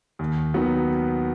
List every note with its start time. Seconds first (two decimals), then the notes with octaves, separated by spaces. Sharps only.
0.19 D#2
0.54 D#3 F#3 B3